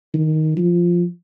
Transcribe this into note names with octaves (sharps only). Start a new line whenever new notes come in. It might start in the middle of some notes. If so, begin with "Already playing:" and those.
D#3
F3